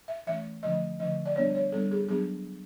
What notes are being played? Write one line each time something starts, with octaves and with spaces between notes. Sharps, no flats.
E5
E3 A3 C#4 E5
D3 F3 A3 C#4 D#5
D3 F3 A3 C#4 D#5
D5
G3 B3 D4 C#5
C#5
G3 B3 D4 A4
G#4
F#3 B3 D4 G#4